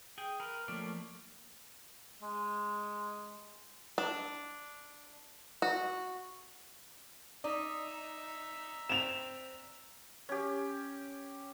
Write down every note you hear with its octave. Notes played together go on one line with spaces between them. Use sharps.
G#4 G5
A#4 B4
F3 A3 A#3 C#4 D5
G#3
D4
F#4
D#4 D5 E5 A#5
C4 E7 F7
C#4 G4